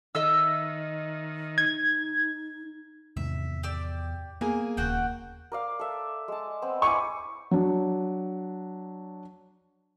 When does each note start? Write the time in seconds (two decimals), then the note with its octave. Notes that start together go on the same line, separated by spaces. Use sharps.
0.15 D#3 D#5 E5 E6
1.58 D#4 G#6
3.17 E2 G#2 C3 D#3 E5
3.63 G4 D5 E6
4.41 A#3 B3 G#4 G#5
4.77 D#1 D#2 C#3 F#4 F#5 G5
5.52 A#4 D5 F5
5.79 A4 E5
6.28 G#3 A5
6.62 B3 C4
6.82 E4 G#5 C#6 D6
7.51 F#3 D4